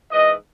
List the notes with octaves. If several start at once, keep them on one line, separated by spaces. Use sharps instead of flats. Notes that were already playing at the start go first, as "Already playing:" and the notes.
G#2 E3 D#5